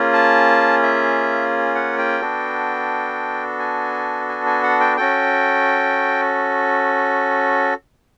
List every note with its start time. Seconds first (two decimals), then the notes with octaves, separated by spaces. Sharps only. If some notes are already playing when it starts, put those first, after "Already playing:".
Already playing: A#3 C#4 F4 G#4
0.13 A5
0.83 E5
1.75 F#5
1.98 G5
2.21 B3 D4 F#4 A4
3.59 G#5
4.29 G#5
4.46 G#5
4.63 F#5
4.80 G5
4.97 C#4 F#4 A4 G5